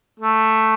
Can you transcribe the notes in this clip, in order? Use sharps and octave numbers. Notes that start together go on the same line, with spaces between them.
A3